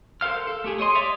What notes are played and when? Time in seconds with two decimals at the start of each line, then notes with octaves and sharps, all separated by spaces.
0.21 A4 A#4 C5 F5 F6
0.47 A4
0.64 A3 G4 G#4
0.78 G#4 C#5 D#5 C6
0.95 C#5 D5 E5 D6 D#6